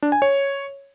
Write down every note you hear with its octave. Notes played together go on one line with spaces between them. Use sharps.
D4
G#5
C#5